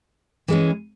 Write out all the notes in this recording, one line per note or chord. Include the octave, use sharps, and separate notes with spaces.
E3 G#3 C#4